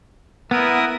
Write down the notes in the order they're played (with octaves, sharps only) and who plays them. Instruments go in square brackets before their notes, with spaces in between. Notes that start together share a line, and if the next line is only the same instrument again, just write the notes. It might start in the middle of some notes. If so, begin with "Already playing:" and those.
[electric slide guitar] B3 [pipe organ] E4 A#4 D#6